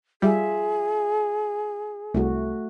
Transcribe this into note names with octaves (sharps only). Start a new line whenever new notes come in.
G3 F4 G#4 E5
C2 A3 F#4